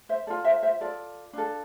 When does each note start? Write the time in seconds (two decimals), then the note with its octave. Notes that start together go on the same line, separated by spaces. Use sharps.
0.09 C5 E5
0.27 A4 D5
0.30 F4
0.44 C5 E5
0.62 C5 E5
0.81 F4 A4 D5
1.33 D4 F4 A4